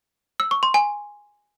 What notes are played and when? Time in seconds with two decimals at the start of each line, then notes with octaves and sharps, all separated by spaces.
0.40 E6
0.51 C#6
0.63 C6
0.74 G#5